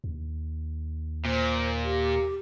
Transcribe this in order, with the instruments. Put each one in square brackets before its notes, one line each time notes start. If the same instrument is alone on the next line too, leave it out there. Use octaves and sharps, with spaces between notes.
[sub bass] D#2
[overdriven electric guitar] A#2 [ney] C5
[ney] G4